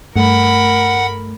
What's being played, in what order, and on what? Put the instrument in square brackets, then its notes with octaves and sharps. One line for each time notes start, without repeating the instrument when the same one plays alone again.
[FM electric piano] G2 A3 [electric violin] A#4 B5 [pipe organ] F#5